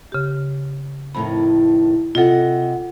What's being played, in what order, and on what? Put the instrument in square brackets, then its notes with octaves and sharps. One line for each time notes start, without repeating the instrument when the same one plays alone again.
[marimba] C#3 G4
[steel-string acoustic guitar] F2 A2 D#3 [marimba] B5
[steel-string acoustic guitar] C3 D#5 F#5 [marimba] F4 A4